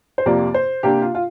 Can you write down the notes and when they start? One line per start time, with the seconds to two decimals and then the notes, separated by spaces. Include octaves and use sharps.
0.18 C5
0.26 F2 C3 A#3 D5
0.54 C5
0.83 C3 A#3 D4 G4
1.02 F4
1.15 F4